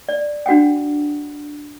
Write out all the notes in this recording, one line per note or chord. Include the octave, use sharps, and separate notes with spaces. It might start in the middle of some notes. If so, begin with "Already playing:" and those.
D5
D4 F#4 F#5 G5